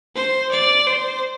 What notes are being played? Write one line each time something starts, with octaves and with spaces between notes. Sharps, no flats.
C5
D5
C5